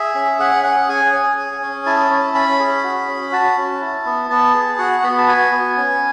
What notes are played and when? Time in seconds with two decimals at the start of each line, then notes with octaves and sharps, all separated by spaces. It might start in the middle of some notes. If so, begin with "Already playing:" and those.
Already playing: G#4 E5
0.15 C#4
0.39 G#4 F#5
0.64 C#4 F#5
0.89 G#4 G#5
1.13 C#4
1.37 G#4
1.62 C#4
1.86 E4 A5
2.11 C#4
2.34 C#4 B5
2.60 G#4
2.84 F#4
3.08 C#4
3.32 F#4 A5
3.57 C#4
3.81 E4
4.06 B3
4.30 B3 A5
4.54 G#4
4.79 F#4 F#5
5.03 B3 B5
5.18 A5
5.27 F#4 G#5
5.52 B3
5.77 C#4